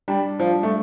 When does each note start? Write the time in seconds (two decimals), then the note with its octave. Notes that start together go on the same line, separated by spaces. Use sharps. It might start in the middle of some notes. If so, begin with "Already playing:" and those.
0.08 G3 D4
0.39 F3 G3
0.63 A3